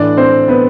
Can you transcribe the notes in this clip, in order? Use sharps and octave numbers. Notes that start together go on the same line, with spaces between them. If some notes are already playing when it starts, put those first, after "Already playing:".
Already playing: A2 E3 D4 D5
C4 C5
B3 B4